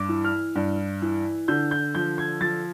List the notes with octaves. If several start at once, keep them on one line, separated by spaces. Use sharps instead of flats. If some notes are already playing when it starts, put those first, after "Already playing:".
Already playing: G2 D6
E3
F6
G2
E3
D3 G6
G6
F3 G6
G#6
F3 A6